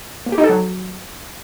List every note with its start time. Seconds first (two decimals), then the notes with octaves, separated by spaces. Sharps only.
0.26 A#3
0.32 G4
0.38 D#4
0.44 A4
0.49 F#3